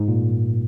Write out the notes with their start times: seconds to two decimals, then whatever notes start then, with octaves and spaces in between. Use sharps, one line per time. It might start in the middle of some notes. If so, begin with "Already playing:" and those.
Already playing: G#2
0.08 A#2